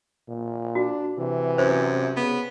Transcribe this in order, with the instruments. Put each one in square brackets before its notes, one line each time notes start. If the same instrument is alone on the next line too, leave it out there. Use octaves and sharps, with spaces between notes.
[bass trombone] A#2
[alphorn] D4 [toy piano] F#4
[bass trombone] C3 [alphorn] E3
[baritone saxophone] F#2 [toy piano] C5
[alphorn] C#3 [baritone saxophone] B3